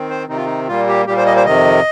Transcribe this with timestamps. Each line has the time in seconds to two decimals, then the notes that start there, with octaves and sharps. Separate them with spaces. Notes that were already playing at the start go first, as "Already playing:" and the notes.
Already playing: D#3 C4
0.09 C5
0.29 C3 D#3 C4 D#4
0.37 F4
0.45 D#4
0.68 A#2 G3 A#3 F4
0.88 G4
1.06 A#2 G3 A#3 G4
1.17 C5
1.26 D#5
1.36 C5
1.46 F2 C3 D#3 D#5